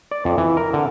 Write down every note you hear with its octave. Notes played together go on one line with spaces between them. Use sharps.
D5
F2
E3
A#4
D3